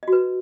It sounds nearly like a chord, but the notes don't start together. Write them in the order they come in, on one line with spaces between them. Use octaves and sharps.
D#5 F#4 B4